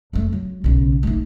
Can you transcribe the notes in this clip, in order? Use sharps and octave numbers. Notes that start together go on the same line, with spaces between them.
F2 A3
F#3
B1 C#3
A3 D#4